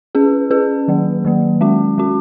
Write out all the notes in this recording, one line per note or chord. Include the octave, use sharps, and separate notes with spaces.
C#4 G#4 B4
C#4 G#4 B4
D#3 F#3 A#3
D#3 F#3 A#3
G#3 C#4 F#4
G#3 C#4 F#4